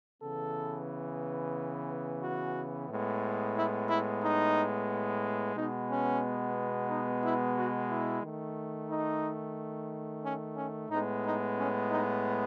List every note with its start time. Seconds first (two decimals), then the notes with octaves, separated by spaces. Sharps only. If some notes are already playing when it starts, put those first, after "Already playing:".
0.22 C#3 E3 B3 A4
2.22 F#4
2.89 A2 G#3 B3
3.56 E4
3.88 E4
4.22 D#4
5.56 B2 G#3 B3 D#4
5.90 C#4
6.89 D#4
7.23 E4
7.56 F#4
7.90 E4
8.23 D#3 A3
8.90 D#4
10.24 C#4
10.56 C#4
10.90 A2 G#3 B3 D#4
11.24 D#4
11.57 C#4
11.91 D#4